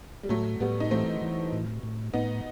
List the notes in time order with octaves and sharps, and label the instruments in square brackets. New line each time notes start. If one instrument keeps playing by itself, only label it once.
[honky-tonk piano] G3
[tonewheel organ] A2 [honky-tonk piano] F#3 A3
[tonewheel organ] A2 [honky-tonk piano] G3 B3
[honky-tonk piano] D#4
[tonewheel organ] E3 [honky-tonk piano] A3 C4
[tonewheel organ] E3
A2
A2
[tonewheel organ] A2 [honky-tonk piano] B3 D#4